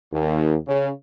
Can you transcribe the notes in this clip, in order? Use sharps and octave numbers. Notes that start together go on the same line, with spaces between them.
D#2
C#3